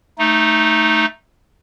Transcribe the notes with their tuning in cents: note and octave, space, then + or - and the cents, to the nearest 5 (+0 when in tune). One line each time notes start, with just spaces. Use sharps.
A3 +0 D#4 +0